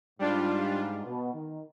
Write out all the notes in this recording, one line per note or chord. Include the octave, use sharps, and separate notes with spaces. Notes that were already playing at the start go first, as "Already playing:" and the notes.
G#2 G3 D4 F4
B2
D#3